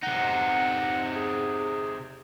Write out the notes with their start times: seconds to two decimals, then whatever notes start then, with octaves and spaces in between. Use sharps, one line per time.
0.03 C3 D#4 F#5
1.16 G#4